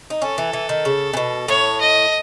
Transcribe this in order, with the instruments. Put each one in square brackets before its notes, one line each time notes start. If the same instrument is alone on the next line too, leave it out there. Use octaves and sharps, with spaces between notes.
[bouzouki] D#4
[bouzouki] C#4 [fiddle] A4
[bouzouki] E3
E3
D#3
C#3
C#3
B2
[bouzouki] A2 [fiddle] C#5
[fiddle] D#5